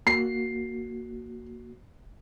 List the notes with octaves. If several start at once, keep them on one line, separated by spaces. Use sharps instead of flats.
A#3 F#4 C7